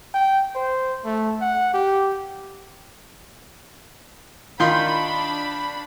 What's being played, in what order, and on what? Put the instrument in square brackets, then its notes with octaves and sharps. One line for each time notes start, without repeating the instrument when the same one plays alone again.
[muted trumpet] G5
C5
A3
F#5
G4
[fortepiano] D#3 F4 C6 [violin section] D4 B5